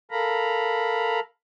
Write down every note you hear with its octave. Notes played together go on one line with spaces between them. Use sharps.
A4 A#4 F5 A#5 B5